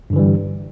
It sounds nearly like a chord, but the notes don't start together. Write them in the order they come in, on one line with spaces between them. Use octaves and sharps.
G2 D3 E3 G3